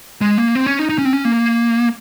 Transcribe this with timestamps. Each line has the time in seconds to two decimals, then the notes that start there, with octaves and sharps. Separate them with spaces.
0.21 G#3
0.38 A#3
0.55 C4
0.66 C#4
0.79 D#4
0.89 D#4
0.98 C#4
1.05 C4
1.13 C#4
1.25 A#3